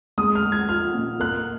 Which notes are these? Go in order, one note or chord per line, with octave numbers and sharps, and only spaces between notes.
G#3 D#6
F6
G#3
G#6
F4 F6
A#2
A#3 F#6